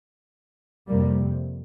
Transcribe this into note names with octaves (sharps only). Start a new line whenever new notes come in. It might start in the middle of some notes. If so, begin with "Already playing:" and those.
F2 C3 G3 A#3